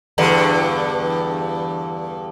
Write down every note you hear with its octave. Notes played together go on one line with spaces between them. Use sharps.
E2 G2 D3